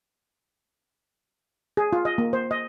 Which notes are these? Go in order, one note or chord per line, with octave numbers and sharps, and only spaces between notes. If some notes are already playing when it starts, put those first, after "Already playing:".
G#4
F4
D#5
A#3
C5
D#5